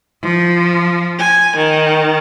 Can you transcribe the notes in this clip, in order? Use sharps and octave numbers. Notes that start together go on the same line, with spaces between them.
F3
G#5
D#3